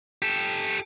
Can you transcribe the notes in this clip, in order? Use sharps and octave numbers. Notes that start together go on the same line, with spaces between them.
G4 A4